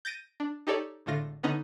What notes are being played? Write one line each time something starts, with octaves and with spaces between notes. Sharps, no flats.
G6 A6 A#6 D7 D#7
D4
D#4 G4 A4 C#5 D5
G#1 A2 D3 A3 F4 A#6
D3 B3 C#4 D#4